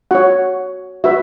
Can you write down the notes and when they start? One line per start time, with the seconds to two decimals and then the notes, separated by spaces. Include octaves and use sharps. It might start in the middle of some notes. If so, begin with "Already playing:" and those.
0.11 F#4 C#5 F#5
1.04 F#4 B4 E5